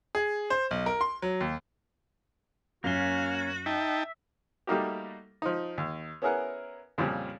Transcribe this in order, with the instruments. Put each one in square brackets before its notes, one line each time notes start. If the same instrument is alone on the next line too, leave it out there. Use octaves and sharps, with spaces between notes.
[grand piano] G#4
C5
B1
A#4
C6
F#3
D#2
[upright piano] F#2 C7 G7 [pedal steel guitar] A#3 C#4 [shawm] F#4 [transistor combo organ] F5
[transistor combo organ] D#4 G5 A5 [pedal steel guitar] E5
[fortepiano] G3 A3 A#3 D#4 F#4 G4
F3 D#4
D#2
B3 C#4 E4 G#4 A#4 F#5
F2 A#2 C#3 F3 G3